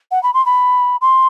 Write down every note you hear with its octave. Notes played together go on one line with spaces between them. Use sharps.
F#5
B5
C6
B5
C6